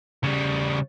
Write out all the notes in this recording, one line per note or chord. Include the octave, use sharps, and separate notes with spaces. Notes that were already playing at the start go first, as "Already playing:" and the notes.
C#3 G3